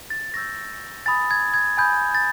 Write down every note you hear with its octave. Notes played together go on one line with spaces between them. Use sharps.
A6
C#6 E6 G6 A#6
G#5 B5 D#6 A6
G#6
G#6
G#5 B5 D#6 G6
A6